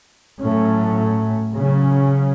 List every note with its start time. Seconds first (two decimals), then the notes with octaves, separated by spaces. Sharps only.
0.41 A2 F#3 A3 C#4
1.55 C#3 F#3 C#4